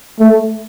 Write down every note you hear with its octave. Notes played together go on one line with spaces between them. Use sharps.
A3